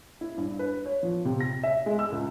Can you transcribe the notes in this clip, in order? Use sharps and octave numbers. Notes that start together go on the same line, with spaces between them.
E4
G2
B4
C#5
F3
C3
A#6
E5
G#3
E6
C#2